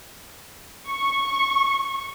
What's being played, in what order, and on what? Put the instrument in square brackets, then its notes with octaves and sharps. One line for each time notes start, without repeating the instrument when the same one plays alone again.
[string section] C#6